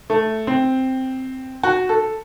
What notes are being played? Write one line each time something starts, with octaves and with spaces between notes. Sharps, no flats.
A3
C4
F#4
A4